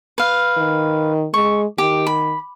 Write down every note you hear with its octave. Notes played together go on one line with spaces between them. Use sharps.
B4 F5
D#3
G#3 C#6
D#3 G4
B5